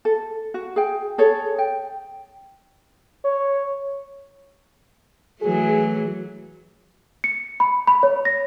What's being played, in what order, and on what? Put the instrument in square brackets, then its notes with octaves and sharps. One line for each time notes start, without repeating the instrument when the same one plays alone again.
[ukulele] A4
F#4
G#4 G5
G#4 A4 C#5
G5
[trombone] C#5
[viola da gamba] E3 F#3 A3 [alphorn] G#4
[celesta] C#7
B5
B5
C#5
A#6